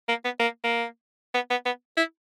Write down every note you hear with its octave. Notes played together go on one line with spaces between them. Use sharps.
A#3
B3
A#3
A#3
B3
B3
B3
E4